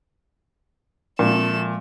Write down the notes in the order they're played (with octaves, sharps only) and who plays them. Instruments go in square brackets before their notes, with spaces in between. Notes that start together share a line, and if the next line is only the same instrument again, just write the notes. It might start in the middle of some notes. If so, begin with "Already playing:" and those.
[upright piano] A#2 [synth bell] F3 G#3 C4 [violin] A3 E7